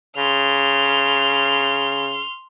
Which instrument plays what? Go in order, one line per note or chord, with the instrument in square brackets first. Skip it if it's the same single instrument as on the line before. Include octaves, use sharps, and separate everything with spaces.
[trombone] C#3 [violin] C6 F6